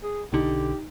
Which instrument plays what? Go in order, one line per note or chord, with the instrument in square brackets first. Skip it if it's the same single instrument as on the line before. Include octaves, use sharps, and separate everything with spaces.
[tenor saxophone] G#4
[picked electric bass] B1 D3 [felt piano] D#4 [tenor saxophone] G4